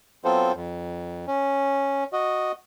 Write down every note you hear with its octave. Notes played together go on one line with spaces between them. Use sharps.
F#3 B3 C4 F4 A4 C5
F2
C#4
F#4 D#5